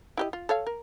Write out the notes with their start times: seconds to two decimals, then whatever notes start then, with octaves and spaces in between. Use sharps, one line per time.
0.17 E4 G4 D#5
0.33 F4
0.49 A4 C#5 F5
0.67 A#4